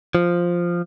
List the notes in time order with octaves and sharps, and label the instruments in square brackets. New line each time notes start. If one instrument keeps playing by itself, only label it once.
[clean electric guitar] F3